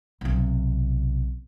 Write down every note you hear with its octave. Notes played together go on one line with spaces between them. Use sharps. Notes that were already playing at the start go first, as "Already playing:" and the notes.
B1 C3